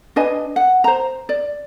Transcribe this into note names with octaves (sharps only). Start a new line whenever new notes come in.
D4 B4 D#5 G#5
F#5
C5 A#5
D5